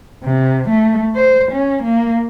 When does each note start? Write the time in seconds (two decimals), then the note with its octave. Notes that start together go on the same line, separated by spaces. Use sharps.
0.24 C3
0.69 A3
1.16 C5
1.52 C#4
1.84 A#3